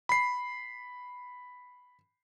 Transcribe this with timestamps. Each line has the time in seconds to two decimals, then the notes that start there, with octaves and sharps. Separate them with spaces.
0.09 B5 C7